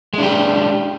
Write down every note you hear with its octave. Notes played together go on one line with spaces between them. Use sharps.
G#3 D4 G4